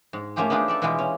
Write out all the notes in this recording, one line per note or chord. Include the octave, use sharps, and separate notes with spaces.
G#2
A3 A#3 C#4 F4 G4 G#4
B3 D4 D#4 F4 G4 G#4
A4 D5 E5
B2 E3 G#3 E4 F4 G4
C#4